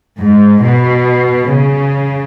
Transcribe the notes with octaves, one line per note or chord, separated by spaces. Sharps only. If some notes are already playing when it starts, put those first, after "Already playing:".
G#2
B2
C#3